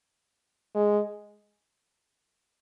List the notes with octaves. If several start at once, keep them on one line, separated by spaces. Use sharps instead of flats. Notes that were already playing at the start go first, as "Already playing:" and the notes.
G#3